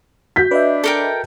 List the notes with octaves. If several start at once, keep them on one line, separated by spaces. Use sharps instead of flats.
F#4 G6 B6
D4 B4 D#5 E5
A4 A#4 G5